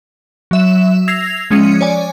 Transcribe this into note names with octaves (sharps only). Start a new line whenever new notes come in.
F#3 E5 E7
E6 G#6 A#6 C7 F7
F3 G#3 C#4 C#7 D#7
C#5 D5 G#5